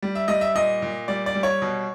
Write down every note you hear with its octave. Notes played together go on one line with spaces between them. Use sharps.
G3
E5
G3 D#5
E5
A#2 D#5
A#2
G3 D5
D5
G3
C#5
B2